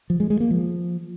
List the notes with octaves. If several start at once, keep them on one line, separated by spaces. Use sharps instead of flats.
F3
G#3
G#3
A#3
F3